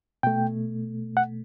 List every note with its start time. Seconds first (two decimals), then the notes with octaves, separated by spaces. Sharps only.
0.23 B2 A3 G5
1.17 F#5